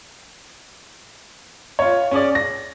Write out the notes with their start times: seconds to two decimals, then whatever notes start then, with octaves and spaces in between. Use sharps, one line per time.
1.79 F4 C#5
2.11 C#4 G#4 D5
2.35 A#6